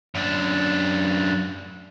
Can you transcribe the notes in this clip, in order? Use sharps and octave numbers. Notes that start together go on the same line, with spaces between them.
F#2 D4